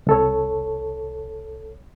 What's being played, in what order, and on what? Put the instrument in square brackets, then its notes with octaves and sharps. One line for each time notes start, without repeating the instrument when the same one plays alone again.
[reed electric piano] C2 A4 C#5